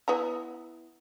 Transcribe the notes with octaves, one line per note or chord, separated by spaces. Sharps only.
B3 E4 A#5